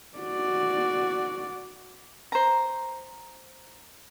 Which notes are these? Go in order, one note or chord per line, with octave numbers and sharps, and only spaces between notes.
F#4 D5
C5 A#5